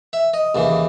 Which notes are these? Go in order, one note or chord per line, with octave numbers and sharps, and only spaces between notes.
E5
D#5
D#2 C#3 E3